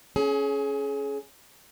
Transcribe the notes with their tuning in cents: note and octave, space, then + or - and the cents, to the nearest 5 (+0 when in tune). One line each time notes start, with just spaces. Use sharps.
C#4 +0 G#4 +30